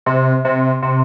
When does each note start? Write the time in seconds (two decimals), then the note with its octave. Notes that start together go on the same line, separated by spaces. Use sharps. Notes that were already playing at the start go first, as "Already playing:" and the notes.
0.06 C3
0.45 C3
0.82 C3